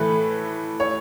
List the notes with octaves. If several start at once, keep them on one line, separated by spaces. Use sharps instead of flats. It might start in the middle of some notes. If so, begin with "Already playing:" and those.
Already playing: A2 E3 A3 B4
C#5